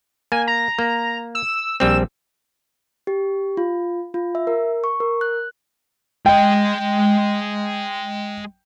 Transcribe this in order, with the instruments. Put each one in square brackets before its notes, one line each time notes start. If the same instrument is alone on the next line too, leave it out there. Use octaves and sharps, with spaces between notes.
[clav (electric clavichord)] A#3 [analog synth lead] G#5
[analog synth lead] A#5
[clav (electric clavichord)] A#3
[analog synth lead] E6
[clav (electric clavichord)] A#1 G3 C4 [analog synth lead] E6
[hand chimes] G4
F4
F4
E5
A#4
C#6
A#4
F#6
[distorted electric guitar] G#3 D#5 [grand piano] G5